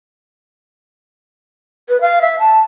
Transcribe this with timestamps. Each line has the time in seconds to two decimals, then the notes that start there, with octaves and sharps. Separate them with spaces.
1.89 B4
2.01 F5
2.21 E5
2.39 A5